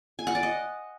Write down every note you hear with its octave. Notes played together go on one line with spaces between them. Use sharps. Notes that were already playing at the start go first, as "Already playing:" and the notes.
G#5
F#5
D5
D#5